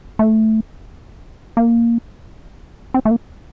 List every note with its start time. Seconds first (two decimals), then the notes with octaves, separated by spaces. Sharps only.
0.19 A3
1.57 A#3
2.94 C4
3.05 A3
3.11 A#3